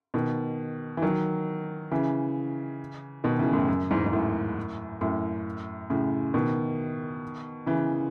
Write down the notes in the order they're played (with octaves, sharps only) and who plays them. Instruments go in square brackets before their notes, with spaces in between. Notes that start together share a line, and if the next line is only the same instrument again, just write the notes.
[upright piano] B2 D#3
E3
D#3 F#3
C#3 E3
B2 D#3
C#3 E3
F#2 A2
F#2
E2 G#2
G#2
F#2 A2
F#2 A2
A2 C#3
B2 D#3
C#3 E3